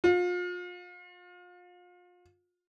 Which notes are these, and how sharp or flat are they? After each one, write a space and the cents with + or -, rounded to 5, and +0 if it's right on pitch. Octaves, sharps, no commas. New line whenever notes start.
F4 +35